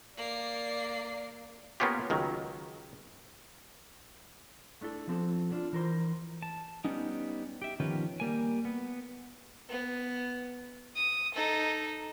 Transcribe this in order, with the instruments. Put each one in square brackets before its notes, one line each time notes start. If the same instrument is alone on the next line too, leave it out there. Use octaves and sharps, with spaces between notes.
[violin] A#3 C7 [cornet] D5
[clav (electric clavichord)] A#3 B3 C#4 F4 G4
C#2 D#3 F#3
[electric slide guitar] A3 D4 E4 A4
F3 C4 A4
D3 D4 F4
E3 A#4 C5
[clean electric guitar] A5
G3 B3 C#4 D#4
G4 E5
D#3 F3 B3 C#4 G4 B4
G3 A#3 G#5
B3
[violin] B3
D#6
D#4 A4